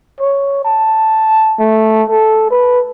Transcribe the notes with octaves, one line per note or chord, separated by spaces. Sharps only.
C#5
A5
A3
A4
B4